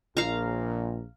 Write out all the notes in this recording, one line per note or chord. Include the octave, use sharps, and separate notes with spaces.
A#1 A#2 F5 A#5